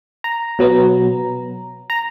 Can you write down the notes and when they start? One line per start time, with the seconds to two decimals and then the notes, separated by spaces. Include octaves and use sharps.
0.24 A#5
0.59 B2 F#3 B3
1.90 A#5